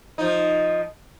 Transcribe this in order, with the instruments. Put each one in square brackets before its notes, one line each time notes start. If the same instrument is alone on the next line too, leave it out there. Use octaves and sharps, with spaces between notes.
[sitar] F3 D#4